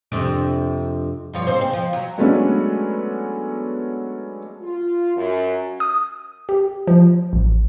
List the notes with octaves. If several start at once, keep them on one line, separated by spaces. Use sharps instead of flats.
F2 C3 D4
G2 F3 C#5
G#2 C4 C5
C4
F3
F#3
F#3 G#3 A3 B3 C#4 D4
F4
F#2
D#6
G4
F3
A1